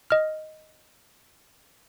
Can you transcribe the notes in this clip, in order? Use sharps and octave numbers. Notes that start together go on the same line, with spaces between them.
D#5 F6